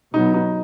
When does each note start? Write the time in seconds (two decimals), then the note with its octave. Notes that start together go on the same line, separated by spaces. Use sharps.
0.14 B2 F#3 B3 D#4
0.34 D#4